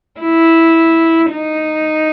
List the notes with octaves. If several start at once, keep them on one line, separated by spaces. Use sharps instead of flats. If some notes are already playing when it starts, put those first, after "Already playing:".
E4
D#4